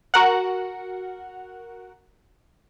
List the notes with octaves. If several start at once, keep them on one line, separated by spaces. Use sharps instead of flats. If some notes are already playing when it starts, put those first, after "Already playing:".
F#4 A#4 F#5